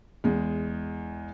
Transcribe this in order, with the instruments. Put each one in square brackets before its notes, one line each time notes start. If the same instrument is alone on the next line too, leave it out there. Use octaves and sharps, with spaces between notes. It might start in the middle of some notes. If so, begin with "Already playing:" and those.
[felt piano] E2 G#3